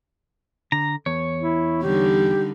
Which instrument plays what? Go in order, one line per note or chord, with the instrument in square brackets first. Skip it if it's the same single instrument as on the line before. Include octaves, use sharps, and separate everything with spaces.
[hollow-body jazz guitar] D3 [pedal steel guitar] A#5
[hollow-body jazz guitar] E2 [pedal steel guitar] C#5
[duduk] E4
[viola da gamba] D3 G3 D#4 [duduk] G4